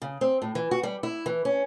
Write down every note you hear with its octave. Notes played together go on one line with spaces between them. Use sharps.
C#3
C4
A2
E3
F#4
G3
E4
E3
C#4